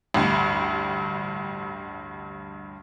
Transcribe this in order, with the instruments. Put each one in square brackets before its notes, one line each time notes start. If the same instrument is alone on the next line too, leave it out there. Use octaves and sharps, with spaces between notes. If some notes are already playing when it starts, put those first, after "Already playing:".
[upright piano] A1 D2 G2